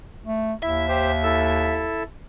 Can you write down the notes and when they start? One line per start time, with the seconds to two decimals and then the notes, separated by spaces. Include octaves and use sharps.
0.25 A3
0.63 D#2 E4 E5
0.89 G4 C5
1.23 E4 A4 E6